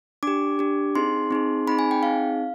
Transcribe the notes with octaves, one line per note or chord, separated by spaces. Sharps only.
D4 G4 D6
D4 G4
C4 D#4 G#4 C6
C4 D#4 G#4
C4 D#4 G#4 B5
G#5
G5
C4 D#4 G#4 F5